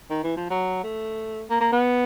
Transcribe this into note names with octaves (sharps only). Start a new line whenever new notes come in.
D#3
E3
F3
F#3
A3
A#3
A#3
B3